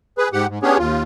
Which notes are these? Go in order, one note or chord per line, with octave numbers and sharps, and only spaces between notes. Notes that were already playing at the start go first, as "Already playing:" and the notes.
G#4 B4
G#2 G4 F#5
G#2
B3 C#4 D4 G4 G#4 C#5
D#2 F4